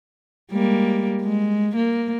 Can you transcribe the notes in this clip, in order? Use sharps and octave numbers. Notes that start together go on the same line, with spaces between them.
G3 G#3 A#3
G#3
A#3